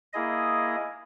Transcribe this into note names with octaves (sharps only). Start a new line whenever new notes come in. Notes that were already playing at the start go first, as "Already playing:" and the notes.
A#3 E4 G#4 D#5